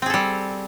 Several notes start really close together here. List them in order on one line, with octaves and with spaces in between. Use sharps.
C4 G#4 A4 G3